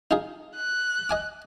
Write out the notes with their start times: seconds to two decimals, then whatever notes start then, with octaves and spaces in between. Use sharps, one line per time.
0.11 D#4 F4 G#4
0.56 F#6
1.09 D#5 G#5 D6